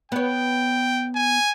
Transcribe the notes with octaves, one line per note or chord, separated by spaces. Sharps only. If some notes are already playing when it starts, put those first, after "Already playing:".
B3 C#5 G5
G#5